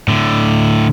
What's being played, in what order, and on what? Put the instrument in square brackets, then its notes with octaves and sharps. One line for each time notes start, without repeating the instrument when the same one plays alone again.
[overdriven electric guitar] A2 D3